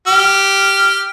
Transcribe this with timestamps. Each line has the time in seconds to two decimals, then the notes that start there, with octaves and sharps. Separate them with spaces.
0.07 G4 F6